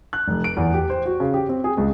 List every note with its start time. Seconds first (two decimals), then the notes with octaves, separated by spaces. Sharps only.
0.13 F#6
0.28 F1
0.44 D7
0.57 E2
0.74 G4
0.90 C5
1.06 F#4
1.20 C#3
1.34 G4
1.49 C4
1.64 G#4
1.77 C#2